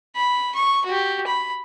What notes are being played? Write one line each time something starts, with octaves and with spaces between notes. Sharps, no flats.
B5
C#6
F#4 G4
B5